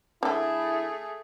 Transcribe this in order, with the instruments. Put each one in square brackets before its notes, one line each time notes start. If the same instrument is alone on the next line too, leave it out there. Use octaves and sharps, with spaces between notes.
[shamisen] D3 A4 [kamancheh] A3 G#4 [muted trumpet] E4